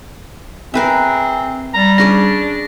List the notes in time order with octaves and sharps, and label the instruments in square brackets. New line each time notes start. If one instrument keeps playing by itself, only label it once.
[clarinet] C4 [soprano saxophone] G#4 [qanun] A#4 B4 E5
[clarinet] G3 [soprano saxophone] A#5
[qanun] C#4 G#4 D5 [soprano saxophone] D4 [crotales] A#6